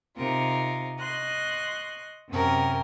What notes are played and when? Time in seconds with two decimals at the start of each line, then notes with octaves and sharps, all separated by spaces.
0.16 C3 D#4 F4 A#4
0.99 D#5 C6 C#6 F#6
2.30 F#2 C3 C#4 A#4 G5